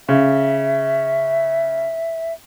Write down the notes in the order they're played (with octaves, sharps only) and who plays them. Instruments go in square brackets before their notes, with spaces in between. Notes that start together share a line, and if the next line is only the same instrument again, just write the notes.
[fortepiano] C#3 [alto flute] E5